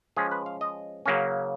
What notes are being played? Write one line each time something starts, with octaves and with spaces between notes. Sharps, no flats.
F3 G#3 C#4 G#4
B4
F5
D#5
C#3 F#3 A#3 C#4